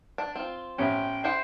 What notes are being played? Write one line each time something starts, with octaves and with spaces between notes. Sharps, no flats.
D4
C4 F4
A1 B3 C#4 G5
E4 G4 C5 F#5